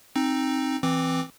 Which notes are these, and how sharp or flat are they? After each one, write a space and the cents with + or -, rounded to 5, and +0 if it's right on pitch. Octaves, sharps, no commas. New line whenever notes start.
C4 +15 D#4 +0
E3 +0 C4 +0 D6 +0